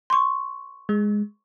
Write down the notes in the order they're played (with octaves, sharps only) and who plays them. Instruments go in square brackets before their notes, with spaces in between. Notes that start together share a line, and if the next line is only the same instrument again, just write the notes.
[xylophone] C6 C#6
[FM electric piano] G#3